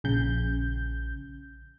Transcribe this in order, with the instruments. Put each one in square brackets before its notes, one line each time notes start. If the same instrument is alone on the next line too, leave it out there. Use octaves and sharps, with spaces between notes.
[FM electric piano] A#1 C#3 G6